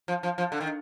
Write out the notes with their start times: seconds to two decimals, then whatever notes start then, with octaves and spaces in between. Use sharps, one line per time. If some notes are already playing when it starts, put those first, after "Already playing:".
0.08 F3
0.23 F3
0.38 F3
0.52 D3
0.61 D#3